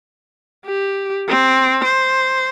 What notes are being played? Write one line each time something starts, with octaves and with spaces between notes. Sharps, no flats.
G4
C4
C5